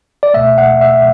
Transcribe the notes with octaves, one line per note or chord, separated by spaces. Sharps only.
D5
C#2 B2 A3 E5
F#5
E5